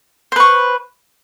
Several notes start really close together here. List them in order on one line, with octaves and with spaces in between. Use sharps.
C5 B4 C#6